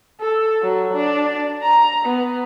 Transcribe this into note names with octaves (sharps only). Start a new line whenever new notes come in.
A4
F#3
D4
A#5
B3